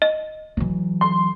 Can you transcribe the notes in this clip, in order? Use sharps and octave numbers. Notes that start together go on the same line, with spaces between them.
D#5
E3 F#3
C6